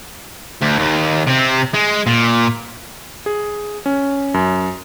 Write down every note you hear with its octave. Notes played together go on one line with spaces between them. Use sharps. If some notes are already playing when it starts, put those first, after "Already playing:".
D2
D#2
C3 C4
G#3
A#2
G#4
C#4
F#2